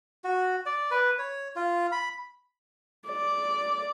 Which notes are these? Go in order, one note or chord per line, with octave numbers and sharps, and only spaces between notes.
F#4
D5
B4
C#5
F4
B5
D5